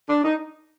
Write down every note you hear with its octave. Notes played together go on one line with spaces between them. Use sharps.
D4
D#4